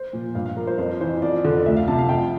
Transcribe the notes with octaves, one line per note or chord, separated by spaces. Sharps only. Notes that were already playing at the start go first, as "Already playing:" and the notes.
Already playing: C5
A#2 F3
G2 F5
F5
F3 A#4
C5
F2 C5
E3 C5
F2 D5
D3 F3
D2 E5
F5
C3 F3 A5
F5
F2 G5